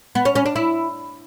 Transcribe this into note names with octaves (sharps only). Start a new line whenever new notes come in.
B3
C#4
C#4
D4
E4